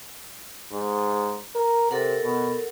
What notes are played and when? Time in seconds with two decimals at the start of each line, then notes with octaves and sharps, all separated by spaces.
0.72 G#2
1.55 A#4
1.91 C3 A4 A#4 F#5
2.23 B2